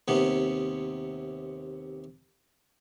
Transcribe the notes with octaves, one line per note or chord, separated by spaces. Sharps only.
D#2 C3 B3